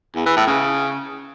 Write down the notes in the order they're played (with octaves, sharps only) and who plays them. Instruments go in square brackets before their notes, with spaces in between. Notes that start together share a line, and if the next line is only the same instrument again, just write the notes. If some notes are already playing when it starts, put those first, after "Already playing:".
[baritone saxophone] E2
E3
A2
C#3